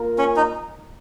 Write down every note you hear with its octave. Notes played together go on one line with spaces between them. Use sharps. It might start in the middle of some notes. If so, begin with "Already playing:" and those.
Already playing: A#3 F4 A#4
C#4
D#4